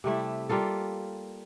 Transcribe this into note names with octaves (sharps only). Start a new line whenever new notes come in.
C3 G3 A3 E4
G3 A#3 F4 A4